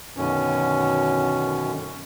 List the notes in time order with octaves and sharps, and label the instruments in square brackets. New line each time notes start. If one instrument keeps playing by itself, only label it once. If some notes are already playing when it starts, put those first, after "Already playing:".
[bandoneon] F#2 B2 D3 D#3 C#4